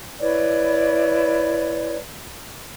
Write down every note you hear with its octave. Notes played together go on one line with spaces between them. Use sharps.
E4 B4 C#5 D5